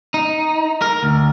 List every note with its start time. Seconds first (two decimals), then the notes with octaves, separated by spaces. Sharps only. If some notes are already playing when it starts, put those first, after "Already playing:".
0.14 D#4
0.82 A#4
1.03 D2